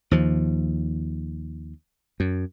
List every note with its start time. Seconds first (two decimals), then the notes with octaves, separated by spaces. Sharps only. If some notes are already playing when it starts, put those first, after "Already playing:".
0.11 D#2 F3
2.20 F#2